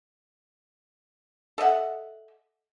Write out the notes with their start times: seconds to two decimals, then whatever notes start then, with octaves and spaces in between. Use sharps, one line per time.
1.58 A4 D#5 E5 F#5